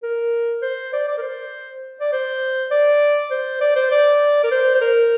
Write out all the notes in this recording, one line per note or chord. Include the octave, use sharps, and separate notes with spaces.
A#4
C5
D5
D5
A#4
C5
D5
C5
D5
C5
D5
C5
D5
A#4
C5
C5
A#4